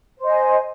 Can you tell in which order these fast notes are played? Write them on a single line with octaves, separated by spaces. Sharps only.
C5 D#5 G#5